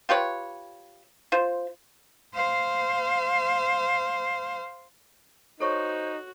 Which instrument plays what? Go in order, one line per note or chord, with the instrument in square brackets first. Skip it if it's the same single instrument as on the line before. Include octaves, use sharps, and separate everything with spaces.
[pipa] F4 G4 B4 C#5
F4 C5
[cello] C5 F5
[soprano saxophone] D#4 [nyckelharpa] F#4 [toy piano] A4 C#5 C#6 [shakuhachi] C5